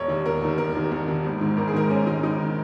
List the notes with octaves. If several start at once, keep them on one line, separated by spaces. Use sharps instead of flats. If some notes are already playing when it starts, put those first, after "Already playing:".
Already playing: E1 C#5
D#2 D#3
E1 A#4
D#2 D#3
E1 A#4
D#2 D#3
E1
D#2 D#3
G#1
G#2 D#3
G#1 A#4
G#4
G#2 D#3 A#4
G#1 C#4
G#2 D#3 D#4
G#1 D#4
D#3